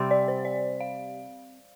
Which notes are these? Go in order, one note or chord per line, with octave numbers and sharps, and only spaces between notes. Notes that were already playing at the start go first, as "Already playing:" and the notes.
Already playing: C3 G3 C4
D5
C5
D5
F5